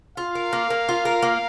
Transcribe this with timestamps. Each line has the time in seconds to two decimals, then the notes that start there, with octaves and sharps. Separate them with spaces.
0.17 F4 F5
0.35 A#4
0.53 A#3
0.70 A#3
0.89 F4
1.05 A#4
1.22 A#3